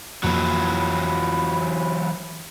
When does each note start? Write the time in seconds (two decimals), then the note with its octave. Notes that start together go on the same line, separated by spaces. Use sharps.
0.24 F2 E3 F#3 A#3 B5